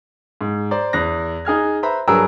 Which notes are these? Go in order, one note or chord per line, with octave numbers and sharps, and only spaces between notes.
G#2
C5 D5 A#5
E2 F#6 A#6
D#4 G#4 F6 G#6
B4 C5 E5 A#5 B5
G2 F#3 G#4 A#4 B4 E6